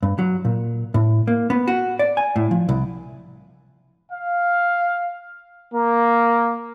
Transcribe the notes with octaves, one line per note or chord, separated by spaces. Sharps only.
G2
F#3
A#2
A2
A#3
B3
F#4
D5
G#5
A2
F3
C2
F5
A#3